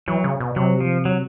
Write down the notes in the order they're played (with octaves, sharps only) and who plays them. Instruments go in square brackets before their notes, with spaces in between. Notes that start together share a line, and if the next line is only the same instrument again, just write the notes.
[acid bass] E3 [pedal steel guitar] F#3
[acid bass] C#3
B2
[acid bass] C3 [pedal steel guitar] F#3
[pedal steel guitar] F3
F#3